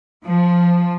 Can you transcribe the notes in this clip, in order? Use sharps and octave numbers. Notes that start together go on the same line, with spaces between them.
F3